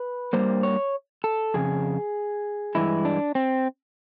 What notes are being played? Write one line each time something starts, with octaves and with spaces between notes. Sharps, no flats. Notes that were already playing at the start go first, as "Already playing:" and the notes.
Already playing: B4
G2 D#3 G3 A#3 C5
C#5
A4
F2 C#3 G#4
G2 E3 G#3 E4
D4
C4